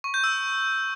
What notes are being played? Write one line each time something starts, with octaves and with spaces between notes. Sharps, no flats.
C#6
G6
E6